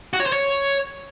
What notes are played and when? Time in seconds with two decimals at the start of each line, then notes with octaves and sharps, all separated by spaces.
0.13 F#4
0.20 C#5
0.26 C5
0.33 C#5